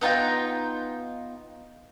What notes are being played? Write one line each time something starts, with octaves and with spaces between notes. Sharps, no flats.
B3 D#4 F4 G5